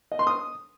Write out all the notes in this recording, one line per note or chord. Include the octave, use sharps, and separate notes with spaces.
D#5
C6
D#6